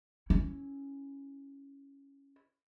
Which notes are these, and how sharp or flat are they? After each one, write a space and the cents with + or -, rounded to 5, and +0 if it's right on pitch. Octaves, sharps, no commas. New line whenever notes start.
C#4 +0 E4 -10